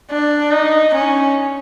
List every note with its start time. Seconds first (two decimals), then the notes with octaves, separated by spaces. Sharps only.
0.11 D4
0.52 D#4
0.94 C#4